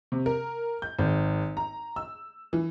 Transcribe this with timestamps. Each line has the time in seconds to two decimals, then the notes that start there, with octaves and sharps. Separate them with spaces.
0.12 C3
0.26 A#4
0.82 G6
0.99 G#1
1.57 A#5
1.96 E6
2.53 E3